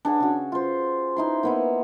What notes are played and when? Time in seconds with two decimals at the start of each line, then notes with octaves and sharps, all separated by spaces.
0.05 D4 G#4 C#5 F#5
0.20 C#3 F#4
0.52 F4 C5
1.17 D#4 E4 C6
1.43 A#3 B3 E4